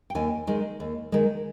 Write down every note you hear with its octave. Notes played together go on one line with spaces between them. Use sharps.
G5
D#2 G#5
D#3 G#3
D#2
D#3 G#3